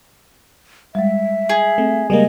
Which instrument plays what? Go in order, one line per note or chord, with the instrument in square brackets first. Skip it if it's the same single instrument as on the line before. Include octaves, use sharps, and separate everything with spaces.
[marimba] G3 G#3 [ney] E5
[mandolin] G#4
[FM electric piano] A3 [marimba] C4
[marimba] C#3 [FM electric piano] G3 G#3 A#3 [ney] D#5